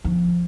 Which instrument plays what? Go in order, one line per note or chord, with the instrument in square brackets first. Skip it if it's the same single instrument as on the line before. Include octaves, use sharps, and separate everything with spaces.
[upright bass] F3